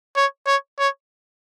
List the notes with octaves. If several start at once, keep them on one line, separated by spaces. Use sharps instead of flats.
C#5
C#5
C#5